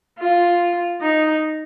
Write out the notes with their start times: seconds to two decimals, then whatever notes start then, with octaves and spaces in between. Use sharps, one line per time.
0.19 F4
1.01 D#4